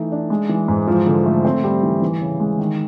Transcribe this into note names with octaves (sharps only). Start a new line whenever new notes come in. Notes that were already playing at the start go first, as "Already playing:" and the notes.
Already playing: E3 A3 D#4
D4
G#3
E3
G#2
F3
D3
A3
C4
G3
E3
E3
C#3
G#3
D#3